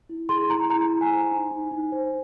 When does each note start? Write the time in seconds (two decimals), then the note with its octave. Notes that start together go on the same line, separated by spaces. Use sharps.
0.09 E4
0.29 G#4 C6
0.49 E4 A#5
0.70 E4 A#5
0.91 E4
1.01 G#5
1.10 C5
1.31 D#4
1.51 D#4
1.71 D#4
1.92 C5